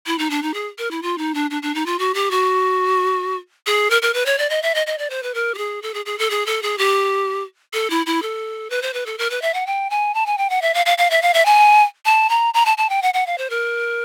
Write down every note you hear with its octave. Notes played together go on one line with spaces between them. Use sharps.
E4
D#4
D4
D#4
G#4
A#4
E4
F4
D#4
D4
D4
D4
D#4
F4
F#4
G4
F#4
G#4
A#4
A#4
B4
C#5
D5
D#5
E5
D#5
D#5
D5
C5
B4
A#4
G4
G#4
A4
G#4
G#4
A4
G#4
A4
G#4
G4
A4
E4
E4
A4
B4
C5
B4
A4
A#4
B4
E5
F#5
G5
G#5
A5
G#5
G5
F#5
E5
F5
F5
F5
E5
F5
E5
G#5
A5
A#5
A#5
A5
A5
G5
F#5
F#5
F5
C5
A#4